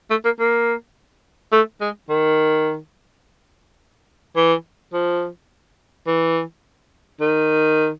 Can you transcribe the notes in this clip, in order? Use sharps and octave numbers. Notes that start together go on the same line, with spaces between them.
A3
A#3
A#3
A3
G#3
D#3
E3
F3
E3
D#3